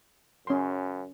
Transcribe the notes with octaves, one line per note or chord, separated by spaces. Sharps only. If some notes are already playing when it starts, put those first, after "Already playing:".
F#2 C#4 C6